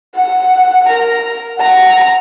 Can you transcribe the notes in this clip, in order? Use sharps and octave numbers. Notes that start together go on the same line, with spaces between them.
F#5
A#4 A#5
F#5 A#5